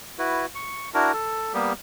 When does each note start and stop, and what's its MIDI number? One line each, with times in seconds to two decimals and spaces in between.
0.19 0.46 64
0.19 0.46 66
0.19 0.46 71
0.55 0.90 85
0.94 1.12 62
0.94 1.12 64
0.94 1.12 66
0.94 1.12 70
1.13 1.53 69
1.54 1.73 55
1.54 1.73 58
1.54 1.73 59
1.54 1.73 67